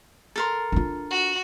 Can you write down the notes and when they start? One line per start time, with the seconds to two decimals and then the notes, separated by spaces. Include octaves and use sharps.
0.36 A4 A#4 C6
0.72 D4 F4
1.10 F#4